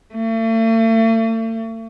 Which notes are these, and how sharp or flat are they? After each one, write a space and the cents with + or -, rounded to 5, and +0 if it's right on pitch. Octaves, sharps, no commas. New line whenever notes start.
A3 +40